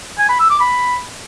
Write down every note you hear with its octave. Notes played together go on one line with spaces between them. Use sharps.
G#5
B5
E6
D6
B5